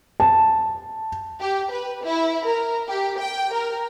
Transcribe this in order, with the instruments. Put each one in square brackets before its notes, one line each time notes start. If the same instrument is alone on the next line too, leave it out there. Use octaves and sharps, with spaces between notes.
[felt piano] A5
[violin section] G4
B4
E4
A#4
G4
G5
A#4